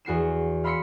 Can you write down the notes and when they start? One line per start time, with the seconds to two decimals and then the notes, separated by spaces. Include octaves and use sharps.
0.05 E2 F#4 C7 E7
0.64 F5 B5 C6 E6 B6 C#7